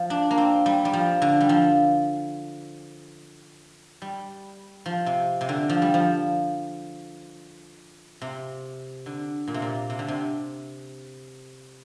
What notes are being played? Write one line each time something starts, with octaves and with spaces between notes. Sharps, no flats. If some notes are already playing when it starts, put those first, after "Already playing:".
Already playing: F3
D4
A#3
C4
G3
G3
F3
D3
G3
F3
G3
F3
C3
C3
D3
F3
G3
F3
C3
D3
A#2
C3
A#2
C3
D3
C3